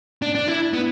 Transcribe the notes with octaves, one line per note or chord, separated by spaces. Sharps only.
D4
D4
E4
B3